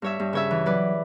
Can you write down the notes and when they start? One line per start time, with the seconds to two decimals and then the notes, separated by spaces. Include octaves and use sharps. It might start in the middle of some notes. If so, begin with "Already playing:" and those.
0.02 G2 C#5 E5
0.20 G2
0.33 C#3 C#5 E5
0.51 E3
0.66 F#3 B4 D5